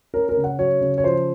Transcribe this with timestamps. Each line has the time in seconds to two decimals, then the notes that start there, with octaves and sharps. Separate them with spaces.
0.14 C#4 A#4
0.29 A#4
0.37 C#3
0.44 F#5
0.59 F#3 C#5
0.81 C#3
0.98 C#5
1.04 F3 C5